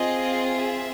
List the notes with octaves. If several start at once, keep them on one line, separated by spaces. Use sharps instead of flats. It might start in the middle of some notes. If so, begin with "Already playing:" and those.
Already playing: C4 F4 G#4 D#5
E5